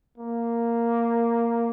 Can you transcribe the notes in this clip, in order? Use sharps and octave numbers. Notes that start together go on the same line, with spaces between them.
A#3